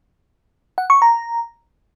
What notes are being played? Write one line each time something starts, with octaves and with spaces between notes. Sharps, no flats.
F#5
C#6
A#5